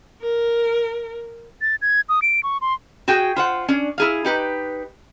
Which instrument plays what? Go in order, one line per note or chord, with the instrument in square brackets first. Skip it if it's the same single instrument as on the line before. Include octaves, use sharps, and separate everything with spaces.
[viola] A#4
[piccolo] A6
G#6
D#6
D7
C#6
C6
[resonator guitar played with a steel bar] F#4 G#4 G5
F4 C5 F#5
C#4 D4
E4 G#4 F5
D#4 G4 B4